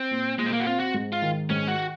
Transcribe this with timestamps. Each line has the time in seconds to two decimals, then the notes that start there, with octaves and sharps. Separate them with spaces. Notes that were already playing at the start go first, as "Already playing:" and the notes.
Already playing: C4
0.11 A#2
0.38 A#2 G#3
0.46 C4
0.53 A#3
0.60 F#4
0.66 C4 F4
0.80 F#4
0.94 G#2
1.13 F4
1.22 D#3
1.50 G#2 C#4
1.68 F#4